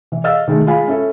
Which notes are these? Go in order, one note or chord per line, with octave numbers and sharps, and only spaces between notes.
E3
D#5 F5 E6 F6 A6
D#3 G#3 A3
G#3 F4 F5 G#5 B5
C#4 E4 A4